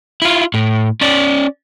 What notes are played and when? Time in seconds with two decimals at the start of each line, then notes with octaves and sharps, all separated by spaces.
0.22 E4 F4
0.54 A2
1.01 C#4 D5